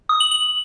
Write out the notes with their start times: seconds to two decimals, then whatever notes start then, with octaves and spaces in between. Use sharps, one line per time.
0.09 D#6
0.20 F#7
0.31 F#7